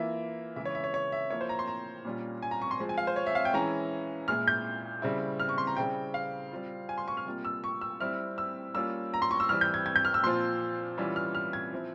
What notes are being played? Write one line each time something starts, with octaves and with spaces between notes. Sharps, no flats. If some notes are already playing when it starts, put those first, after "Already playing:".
Already playing: E3 A#3 F4 E5
C#3 E3 G#3 E4 E5
C#5
E5
C#5
C#5
E5
F3 A#3 E4 C#5
C5
A#5
C6
A#5
A#2 G3 C#4 F4
G#5
A#5
C#6
C6
F3 G#3 C4
G#5
F5
C5
C#5
E5
F5
G5
E3 G#3 C#4 E4 A#5
A#2 G#3 E4 F6
G6
C#3 G3 C4 E4
F6
C#6
C6
A#5
C#3 G3 C4 E4 G5
F5
G3 C4 F4
G#5
C6
C#6
F6
C3 G3 A#3 F4
E6
C#6
E6
G3 C4 E4 F6
E6
G3 A#3 C#4 F4 E6
A#5
C6
C#6
E6
E3 G3 C4 F6
G6
G#6
G#6
G6
F6
E6
A#2 F3 C4 F4 C6
E3 G3 C#4 F4
F6
F6
G#6
F3 C4 E4